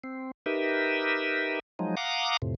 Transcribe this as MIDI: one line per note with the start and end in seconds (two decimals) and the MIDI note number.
0.04 0.31 60
0.46 1.59 63
0.46 1.59 67
0.46 1.59 70
0.46 1.59 71
0.46 1.59 76
1.79 1.95 53
1.79 1.95 54
1.79 1.95 56
1.79 1.95 63
1.97 2.37 77
1.97 2.37 78
1.97 2.37 82
1.97 2.37 86
1.97 2.37 87
2.42 2.55 41
2.42 2.55 45
2.42 2.55 48